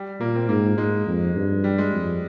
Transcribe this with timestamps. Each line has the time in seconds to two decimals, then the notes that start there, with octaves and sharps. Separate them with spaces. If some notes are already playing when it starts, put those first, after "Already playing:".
Already playing: G3
0.20 A#2 A#3
0.35 C4
0.49 G#2 A#3
0.78 G#2 G#3
1.07 F2
1.36 G2
1.64 G3
1.78 G#3
1.93 F2